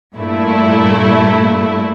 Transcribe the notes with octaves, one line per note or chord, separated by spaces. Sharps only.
G2 A#2 A3 E4